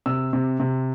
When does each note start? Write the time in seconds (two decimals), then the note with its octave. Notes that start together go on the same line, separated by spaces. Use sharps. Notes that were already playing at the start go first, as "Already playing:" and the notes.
0.06 C3 E6
0.33 C3
0.60 C3